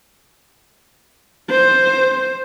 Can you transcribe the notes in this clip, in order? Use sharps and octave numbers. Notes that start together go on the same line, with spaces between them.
C5